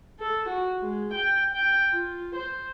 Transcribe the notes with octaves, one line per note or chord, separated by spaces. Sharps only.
A4
F#4
G#3
G5
G5
F4
C5